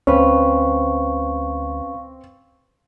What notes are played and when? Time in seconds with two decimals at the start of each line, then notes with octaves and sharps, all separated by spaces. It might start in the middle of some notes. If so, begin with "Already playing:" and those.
0.07 D2 C4 C#4 B4 F5 C#6